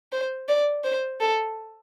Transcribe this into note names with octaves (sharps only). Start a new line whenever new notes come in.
C5
D5
C5
A4